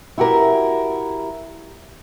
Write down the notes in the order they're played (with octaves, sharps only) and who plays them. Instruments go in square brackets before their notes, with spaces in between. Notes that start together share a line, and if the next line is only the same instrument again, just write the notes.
[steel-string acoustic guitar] E4 F#4 G4 A#4